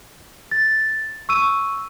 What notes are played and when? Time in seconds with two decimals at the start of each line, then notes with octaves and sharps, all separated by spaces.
0.51 A6
1.29 C#6 E6 D#7